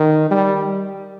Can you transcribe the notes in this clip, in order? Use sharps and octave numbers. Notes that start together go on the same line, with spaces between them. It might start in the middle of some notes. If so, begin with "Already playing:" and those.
Already playing: D#3
G3